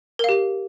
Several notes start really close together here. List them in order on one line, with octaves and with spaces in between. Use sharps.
A#4 F5 G4